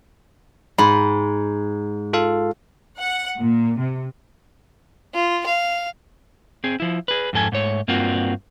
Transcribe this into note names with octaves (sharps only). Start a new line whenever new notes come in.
G#2 B5
F4 A4 F5
F#5
A#2
C3
F4
F5
C4 G#4
F3 E4
G#4 B4
F2 G#2 A4 G#5
G#2 A3 C#5
G2 A#3 C4 F4 F#4